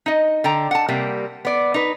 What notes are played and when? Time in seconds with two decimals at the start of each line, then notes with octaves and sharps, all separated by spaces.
0.06 D#4 D#5
0.44 D3 G5 A#5
0.71 F#5 A5
0.89 C3 G3 A#3
1.45 B3 D5
1.74 D#4 B4